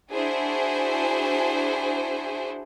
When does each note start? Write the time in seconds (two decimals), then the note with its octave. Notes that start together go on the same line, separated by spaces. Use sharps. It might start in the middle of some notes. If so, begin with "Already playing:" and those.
0.12 D4 E4 F#4 G#4 C5